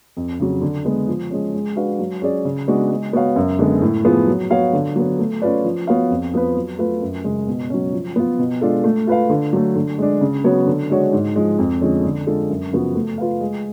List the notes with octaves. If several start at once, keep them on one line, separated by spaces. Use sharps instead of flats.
F2
C#3 F#3
D3
G#3 B3
F3
G#3 C#4
G#3
D4 F#4 B4 F5
F#3
C#4 G#4 D5
C#3
G#3 B3 D4 F#4
G#3
B3 F#4 C#5 F5
F#2
D3 G#3 B3
A2
F3 B3 F4 G#4
F#3
B3 F#4 C#5 F5
D3
F#3 B3
A3
C#4 F4 B4 D5
F3
B3 F#4 C#5 F5
F2
F3 B3 F4 B4
F#3
A3 F4 B4
F#2
C#3 G#3
B2
F#3 C#4
F3
B3 F4
B2
G#3 D4 F4 A4
A3
F4 B4 F5
D3
F#3 A3
D3
G#3 D4
C#3
F#3 B3 F#4 C#5
D3
G#3 D4 F#4 C#5
G#2
F3 G#3
F2
D3 F3 G#3 C#4
D3
G#3 D4 F4 A4
F#2
C#3 F3 B3 F#4
A3
F4 B4 F5
G#3